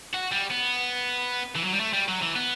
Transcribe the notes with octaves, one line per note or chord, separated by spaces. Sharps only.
F#4
G3
B3
E3
F#3
G3
A3
G3
F#3
E3
B3